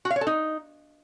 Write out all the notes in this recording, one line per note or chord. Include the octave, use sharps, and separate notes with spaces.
F#4
F5
C#5
A4
D#4